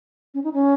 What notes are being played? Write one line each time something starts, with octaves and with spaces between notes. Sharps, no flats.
C#4
D#4
C#4